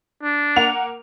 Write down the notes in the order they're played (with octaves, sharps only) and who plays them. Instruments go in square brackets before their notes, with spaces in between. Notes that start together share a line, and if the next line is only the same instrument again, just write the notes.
[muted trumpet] D4
[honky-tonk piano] A#3 F#5 F7